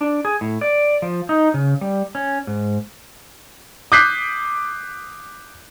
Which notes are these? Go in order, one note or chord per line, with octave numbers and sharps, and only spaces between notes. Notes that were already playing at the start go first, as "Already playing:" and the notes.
D4
G#4
A2
D5
F3
D#4
C#3
G3
C#4
G#2
D6 D#6 F#6 G6 B6 C7